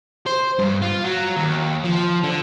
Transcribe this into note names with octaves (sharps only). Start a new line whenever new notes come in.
C5
G2
F4
F#3
D#2
F3
D3